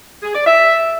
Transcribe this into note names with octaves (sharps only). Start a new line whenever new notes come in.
G#4
D5
E5